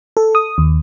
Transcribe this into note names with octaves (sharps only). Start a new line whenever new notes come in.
A4
D#6
D#2